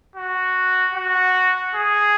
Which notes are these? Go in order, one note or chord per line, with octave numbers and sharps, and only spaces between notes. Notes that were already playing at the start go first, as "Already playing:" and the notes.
F#4
F#4
G#4